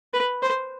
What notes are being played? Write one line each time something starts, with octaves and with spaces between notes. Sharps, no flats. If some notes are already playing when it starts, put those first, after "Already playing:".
B4
C5